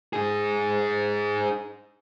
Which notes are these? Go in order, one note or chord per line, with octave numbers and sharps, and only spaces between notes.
D#4 G#4